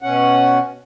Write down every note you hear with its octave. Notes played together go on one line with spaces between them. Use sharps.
B2 C#4 F#5